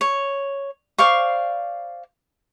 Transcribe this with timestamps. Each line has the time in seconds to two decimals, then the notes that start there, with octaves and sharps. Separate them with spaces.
0.01 C#5
0.98 C5 D5 F5 C#6